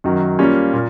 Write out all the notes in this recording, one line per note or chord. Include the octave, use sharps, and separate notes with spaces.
F#2 D#3 F#3
G3 A#3 C#4 F4
A#2